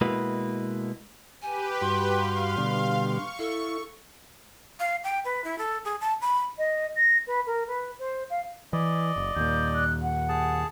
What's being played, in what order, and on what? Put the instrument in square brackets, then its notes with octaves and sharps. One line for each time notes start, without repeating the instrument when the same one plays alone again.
[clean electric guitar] B2 G#3 A#3 E4 F#4 B4
[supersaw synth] G4 B4 [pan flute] G#5
[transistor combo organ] G2 F#4 [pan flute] C6
[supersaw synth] F5
[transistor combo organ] B2 D3 G3
[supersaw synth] C#6
[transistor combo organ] E4 [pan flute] A4
[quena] F5
G5
B4
E4
A4
G#4
A5
B5
[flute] D#5
A#6
B4
A#4
B4
C5
F5
[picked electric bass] E3 [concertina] D5 D#5
[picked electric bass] F#1
[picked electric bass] D#2 A#2 [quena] G6
[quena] F#6
F#5
[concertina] G#4 A5